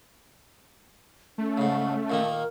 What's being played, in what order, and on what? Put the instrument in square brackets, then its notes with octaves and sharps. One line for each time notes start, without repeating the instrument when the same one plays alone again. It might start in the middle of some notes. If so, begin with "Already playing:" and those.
[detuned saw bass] A3 [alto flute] C#4
[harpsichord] G#2 C#3
A#2 D#3 A#3
[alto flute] A#4